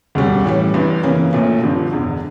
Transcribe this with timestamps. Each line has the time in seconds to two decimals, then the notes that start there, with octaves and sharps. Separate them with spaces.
0.15 E1 D2 C#3 G3
0.44 A2 E3 G3 C#4
0.74 G1 G2 E3
1.03 F2 C#3 E3 A#3 C#4
1.33 A#1 A#2 A3 C#4
1.62 G1 G2 D3 F3
1.92 E1 E2 D3